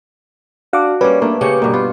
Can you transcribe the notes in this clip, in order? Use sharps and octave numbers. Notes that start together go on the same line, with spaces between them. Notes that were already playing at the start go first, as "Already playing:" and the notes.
D4 F#4 F5 D6
G3 A#3 C#4 B4
A3 A#3 D4
C#3 A#3 C#4 G4 C#7
G2 B2 A#3
B3 F4